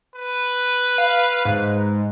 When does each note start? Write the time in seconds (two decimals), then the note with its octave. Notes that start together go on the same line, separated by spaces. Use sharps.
0.15 B4
0.98 F5
1.45 G#2